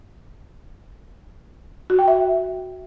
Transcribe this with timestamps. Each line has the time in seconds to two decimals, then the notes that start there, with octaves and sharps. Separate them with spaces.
1.90 F#4
1.99 G5
2.08 E5